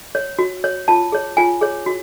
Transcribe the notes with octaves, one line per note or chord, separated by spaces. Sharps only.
C#5
F#4
C#5
F4 A5
G#4 C#5
F4 G#5
G#4 C#5
F#4